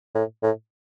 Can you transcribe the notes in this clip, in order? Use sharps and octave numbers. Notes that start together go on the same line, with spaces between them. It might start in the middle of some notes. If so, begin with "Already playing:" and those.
A2
A2